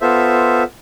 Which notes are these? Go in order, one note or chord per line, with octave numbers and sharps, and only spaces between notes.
B3 F4 A4 C5 E5